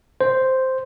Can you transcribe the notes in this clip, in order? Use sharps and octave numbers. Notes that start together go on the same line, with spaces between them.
C5